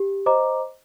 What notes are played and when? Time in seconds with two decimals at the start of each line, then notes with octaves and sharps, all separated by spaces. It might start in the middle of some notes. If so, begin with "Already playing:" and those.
Already playing: G4
0.26 C5 D#5 A#5 D6